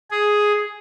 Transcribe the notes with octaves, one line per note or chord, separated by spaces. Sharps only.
G#4